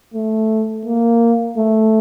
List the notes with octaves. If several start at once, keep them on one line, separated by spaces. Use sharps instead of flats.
A3
A#3
A3